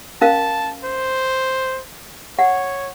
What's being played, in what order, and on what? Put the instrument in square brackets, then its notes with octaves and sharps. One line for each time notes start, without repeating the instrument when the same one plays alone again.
[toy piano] C#4 A#4 F5 [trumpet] A5
[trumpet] C5
[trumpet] C#5 [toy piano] F#5